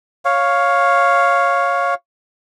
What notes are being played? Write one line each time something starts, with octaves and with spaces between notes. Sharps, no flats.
C#5 F5